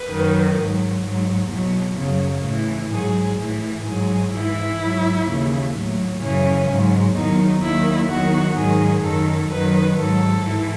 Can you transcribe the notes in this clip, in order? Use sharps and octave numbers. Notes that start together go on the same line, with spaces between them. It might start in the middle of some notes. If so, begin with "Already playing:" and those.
Already playing: B4
F#2 D#3 F#3
G#2 F#3
G#2 F#3
E2 B2 F#3
F#2 C#3 F#3
A2 E3
G#2 F#3 G#4
A2 E3
G#2 F#3 G#4
G#2 E3 E4
G#2 F#3
D#2 C#3 E3
A2 F#3
F#2 C#3 E3 C#4
G#2 F#3
E2 D#3 F#3 D#4
D#2 D#3 F#3 E4
E2 D#3 F#3 F#4
G#2 D#3 F#3 G#4
F#2 D#3 F#3 A4
F#2 D#3 F#3 B4
G#2 F#3 A4
G#2 E3